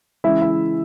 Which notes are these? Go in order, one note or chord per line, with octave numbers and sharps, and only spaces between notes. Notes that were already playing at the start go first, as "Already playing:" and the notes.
C#3 E3 G#3 E4 E5
E4 E5